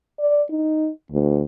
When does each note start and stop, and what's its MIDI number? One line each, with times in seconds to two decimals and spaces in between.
0.19 0.42 74
0.50 0.90 63
1.12 1.43 38